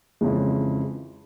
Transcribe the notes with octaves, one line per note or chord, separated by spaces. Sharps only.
F2 C#3 E3 G#3